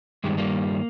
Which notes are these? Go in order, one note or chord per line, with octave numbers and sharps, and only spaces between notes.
G2 D#3 G3 G#3
G3 A#3